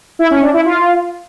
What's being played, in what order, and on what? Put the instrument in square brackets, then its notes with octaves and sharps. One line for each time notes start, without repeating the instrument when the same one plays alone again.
[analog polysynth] E4
C#4
D4
E4
F4